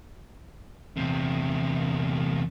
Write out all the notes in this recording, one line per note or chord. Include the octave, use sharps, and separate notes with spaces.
E2 C3